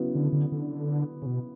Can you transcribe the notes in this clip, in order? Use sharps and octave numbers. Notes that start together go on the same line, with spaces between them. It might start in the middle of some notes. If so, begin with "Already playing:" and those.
Already playing: C#3 F#3 B3 E4
D3
D3
D3
C#3
B2